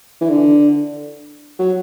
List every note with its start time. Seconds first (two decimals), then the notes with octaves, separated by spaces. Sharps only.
0.21 E3
0.29 D3
1.59 F#3